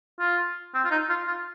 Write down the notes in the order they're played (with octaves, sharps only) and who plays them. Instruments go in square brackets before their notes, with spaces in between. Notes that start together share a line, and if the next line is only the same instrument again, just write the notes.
[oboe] F4
C4
F4
D#4
F4
F4